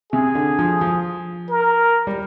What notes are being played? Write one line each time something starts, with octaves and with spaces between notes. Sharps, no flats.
C3 G#4
D3
F3
F3
A#4
G3